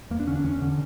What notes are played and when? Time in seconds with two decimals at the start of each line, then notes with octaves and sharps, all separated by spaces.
0.10 E2 A#3
0.20 D4
0.28 D3 C#4
0.36 D4
0.44 E2 C#4
0.62 D3